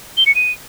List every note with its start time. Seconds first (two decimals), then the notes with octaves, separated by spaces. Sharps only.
0.17 G7
0.26 C#7
0.35 D#7